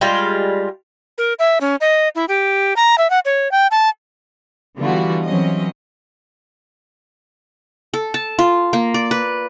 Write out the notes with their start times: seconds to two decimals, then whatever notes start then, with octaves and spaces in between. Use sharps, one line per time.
0.01 G3 G#3 F4
1.18 A#4
1.39 E5
1.61 C#4
1.81 D#5
2.15 E4
2.28 G4
2.76 A#5
2.98 E5
3.10 F#5
3.25 C#5
3.51 G5
3.71 A5
4.79 D3 E3 G3 B3 F4 F#4
5.27 E3 F#3 C4 C#4 D#5
7.94 A4
8.14 A5
8.39 F4
8.73 A#3
8.94 D5
9.11 B4